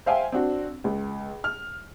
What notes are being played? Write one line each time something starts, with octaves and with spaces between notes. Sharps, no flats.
C5 E5 F5 G5 G#5
C4 D4 F#4
C#2
F6